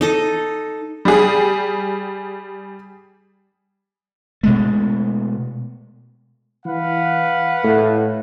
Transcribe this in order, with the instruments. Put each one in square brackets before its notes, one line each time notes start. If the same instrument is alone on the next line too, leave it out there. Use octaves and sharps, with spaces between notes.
[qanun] D#4 A4 D#5
[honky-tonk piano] G3 G#4
[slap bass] B2 G#3 A3
[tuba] E3 [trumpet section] B4 F5 F#5
[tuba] A2